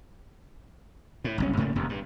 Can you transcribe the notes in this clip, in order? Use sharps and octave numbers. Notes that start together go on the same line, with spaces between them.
A2
F#1 C2 C#4
G#2 C#3 A3 A#3
E1 D#2 C3
G2